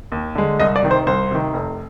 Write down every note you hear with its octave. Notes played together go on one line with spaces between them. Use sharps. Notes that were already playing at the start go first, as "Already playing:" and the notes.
D#2
D3 G#3
C2 D#5
D5
C3 D#3
C5
C2 C5
C3 D#3
F1